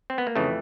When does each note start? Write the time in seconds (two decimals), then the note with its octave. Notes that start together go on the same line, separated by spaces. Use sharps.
0.10 C4
0.18 B3
0.27 A#3
0.35 F2 C#3 E3 A3